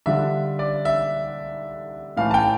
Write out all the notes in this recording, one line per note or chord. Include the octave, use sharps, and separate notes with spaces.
D3 G3 D4 F4 E5
D5
E5
A2 E3 A3 F5
A5
G5